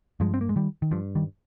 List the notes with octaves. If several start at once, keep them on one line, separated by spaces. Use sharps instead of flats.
G2 F3 G#3
C4
A#3
G#3
D#3 G3
D#3
G2 F3
D#3 G3